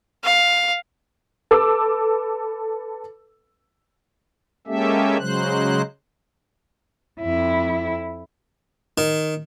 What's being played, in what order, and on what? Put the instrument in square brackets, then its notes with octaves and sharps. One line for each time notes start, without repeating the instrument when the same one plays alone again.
[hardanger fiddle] F5
[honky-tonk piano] A4 B4 D6 E6
[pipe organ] G#3 A#3 C#4 G4 A4 E5
C#3 F#3 G#3 C5 F#6
[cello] F2 E4
[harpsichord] D#3